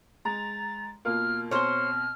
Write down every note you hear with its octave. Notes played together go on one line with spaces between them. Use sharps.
G#3 A#5 A6
B2 A#3 F4 F6
B2 C4 C5 C#5 F6 G7